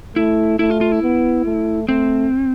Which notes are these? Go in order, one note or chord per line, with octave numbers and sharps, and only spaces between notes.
A3 E4
A3 E4
F4
F4
E4
B3
A3
A3 C4